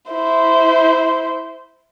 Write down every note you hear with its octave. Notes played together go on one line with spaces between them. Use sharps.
E4 C5